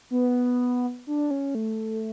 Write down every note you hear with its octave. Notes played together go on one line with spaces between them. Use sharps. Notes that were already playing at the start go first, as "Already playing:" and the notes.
B3
D4
C#4
A3